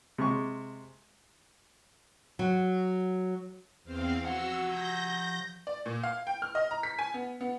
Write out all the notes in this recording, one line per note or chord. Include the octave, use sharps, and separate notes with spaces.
C3 G#3 C#6
F#3
E2 C4 F5
F3 F#4 F#5 E6
G6 A#6
D5
A#2
F5
G5
F6
D#5
A#5
B6
G#5
B3
B3